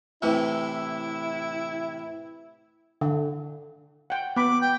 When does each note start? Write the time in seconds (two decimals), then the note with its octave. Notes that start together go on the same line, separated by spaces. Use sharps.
0.22 A2 C3 E3 E4
3.01 D3
4.10 F#5 G5
4.36 B3 B5 D6
4.61 G5